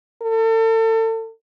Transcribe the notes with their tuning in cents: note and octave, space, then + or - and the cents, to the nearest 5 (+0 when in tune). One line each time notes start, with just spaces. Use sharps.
A4 +35